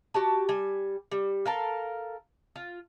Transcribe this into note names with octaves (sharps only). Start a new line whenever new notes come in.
F#4 G4 A5
G3 G#5
G3
A4 A#4 F5
F4